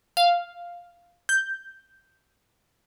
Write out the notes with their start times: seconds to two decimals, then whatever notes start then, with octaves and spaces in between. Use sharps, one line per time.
0.17 F5
1.29 G6